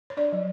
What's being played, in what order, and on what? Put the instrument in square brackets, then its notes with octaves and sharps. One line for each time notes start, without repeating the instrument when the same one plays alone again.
[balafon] C#5
D4 D5
F#3